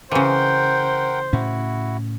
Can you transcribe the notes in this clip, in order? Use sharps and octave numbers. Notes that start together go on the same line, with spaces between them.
C#3 E3 A#4 C5 F#5 G5
A2 C#4 E4 F#4